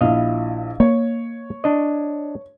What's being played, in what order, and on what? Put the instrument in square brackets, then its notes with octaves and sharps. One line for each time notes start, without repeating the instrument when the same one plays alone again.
[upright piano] A#1 E4 [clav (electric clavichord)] D#5 F5
[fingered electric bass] A#3 [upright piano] C#5
[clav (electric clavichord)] D4 D#5